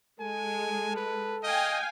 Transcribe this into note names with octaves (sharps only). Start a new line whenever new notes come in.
G#3 A4 G#5
B4
D#5 F5 G5 G#5